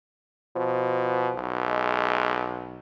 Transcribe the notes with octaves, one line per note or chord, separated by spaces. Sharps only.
B2 F3
B1
G#3